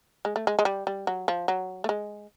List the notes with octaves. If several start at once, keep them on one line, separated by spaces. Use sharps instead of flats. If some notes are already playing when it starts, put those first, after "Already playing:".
G#3
A3
G#3
G#3
G3
G3
F#3
F3
F#3
A3
G#3